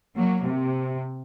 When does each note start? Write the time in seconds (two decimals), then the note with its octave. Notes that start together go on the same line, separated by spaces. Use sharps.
0.14 F#3 A#3
0.44 C3